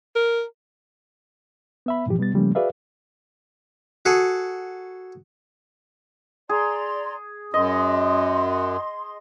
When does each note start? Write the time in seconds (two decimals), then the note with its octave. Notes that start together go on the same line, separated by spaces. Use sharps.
0.16 A#4
1.86 B3 E5 B5
2.06 G2 A#2 E3 F3 G4
2.19 B2 G3 B3 A6
2.34 C#3 F3 G3 A3 A#3 C#4
2.55 F#4 G#4 B4 D5 E5 F5
4.05 F#4 G#4 A4
6.49 G#4 D5 A#5 C6
7.54 F#2 D#5 C6